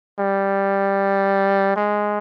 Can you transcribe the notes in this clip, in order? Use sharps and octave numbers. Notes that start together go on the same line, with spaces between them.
G3
G#3